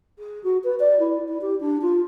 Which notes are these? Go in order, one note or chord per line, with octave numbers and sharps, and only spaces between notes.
G#4
F#4
B4
D5
E4
E4
G4
D4
F4